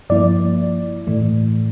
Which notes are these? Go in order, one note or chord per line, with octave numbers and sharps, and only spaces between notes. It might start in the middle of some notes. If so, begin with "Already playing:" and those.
G2 F3 A#3 E4 D5
A2 E3 A3